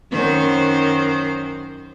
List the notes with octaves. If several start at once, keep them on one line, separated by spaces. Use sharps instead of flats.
F#2 D#3 C5